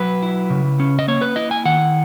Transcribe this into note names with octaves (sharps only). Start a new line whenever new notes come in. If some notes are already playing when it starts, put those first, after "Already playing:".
Already playing: F#3 B4
E4
C#3
C#4
D#5
A#3 C#5
B4
E4 D#5
G#5
D#3 F#5